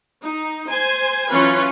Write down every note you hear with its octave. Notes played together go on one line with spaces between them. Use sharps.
D#4
C5 G#5
E3 F#3 C#4 F4 B4